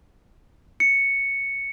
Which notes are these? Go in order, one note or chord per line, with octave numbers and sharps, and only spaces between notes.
C#7